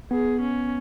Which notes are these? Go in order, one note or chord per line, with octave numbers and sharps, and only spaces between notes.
B3 G#4
C#4